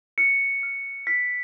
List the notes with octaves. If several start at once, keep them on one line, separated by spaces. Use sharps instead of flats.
F6 C#7
F6
F6 B6